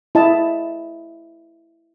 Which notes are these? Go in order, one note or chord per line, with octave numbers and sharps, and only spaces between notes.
E4 D#5 A5